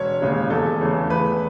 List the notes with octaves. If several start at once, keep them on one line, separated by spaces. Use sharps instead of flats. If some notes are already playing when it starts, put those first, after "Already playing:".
Already playing: E1 C#5
D#2 C#3 E3 G#3
E2 A4
C#3 E3 A3
E2 B4